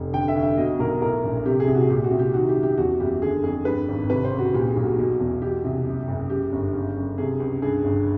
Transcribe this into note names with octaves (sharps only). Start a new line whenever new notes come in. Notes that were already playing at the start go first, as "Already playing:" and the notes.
Already playing: F1
D3 G5
E5
D2
E5
B2 D#5
B1 A#4
A2 A#4
A#1
C3 G4
G#4
C2
F#4
A#2 G4
F#4
C2
G4
D#3 F#4
G4
F#2
G4
E2 F#4
F#1 G4
D3 G#4
F2 G#4
G2 B4
G#1
C3 B4
C5
C#2
F#4
A#2 G4
G#4
B1
F#4
B2
E2
B2 G4
C2
F#2
F#1
F#2 G4
G1
C#3
F#2
C3 G#4
C#2
G2 G#4
G1